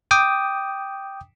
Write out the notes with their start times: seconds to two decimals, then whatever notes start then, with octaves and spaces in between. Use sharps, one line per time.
0.11 G5 D6 D#6